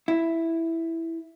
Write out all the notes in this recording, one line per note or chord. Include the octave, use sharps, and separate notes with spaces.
E4